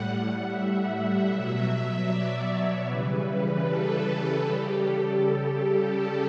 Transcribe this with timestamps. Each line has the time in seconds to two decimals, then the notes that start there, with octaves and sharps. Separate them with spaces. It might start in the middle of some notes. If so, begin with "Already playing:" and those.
Already playing: A2 G3 F#5
0.46 E5
1.25 B2 F#3
2.05 D5
2.45 C#5
2.85 C#3 E3 G3 B4
3.64 A4
4.04 A4
4.45 C#3 G3 G4
4.84 A4
5.24 A4